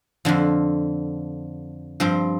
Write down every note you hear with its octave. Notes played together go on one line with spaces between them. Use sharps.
F2 D3 F3
G2 F3 C4